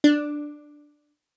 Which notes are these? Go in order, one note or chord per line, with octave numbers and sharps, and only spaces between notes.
D4